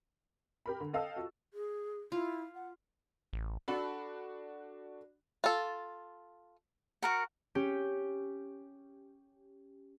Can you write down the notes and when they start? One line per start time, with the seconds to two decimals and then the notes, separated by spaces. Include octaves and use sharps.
0.66 G4 A#4 B5
0.80 D3
0.93 A4 D#5 F5 G5 A5 E6
1.16 F4 F#4
1.54 G#4
2.12 E4 F4
2.55 F#5
3.33 A1
3.68 D4 F#4 A4 B5
5.44 F4 A4
7.02 F#4 A#4 F#5
7.55 C#4 G4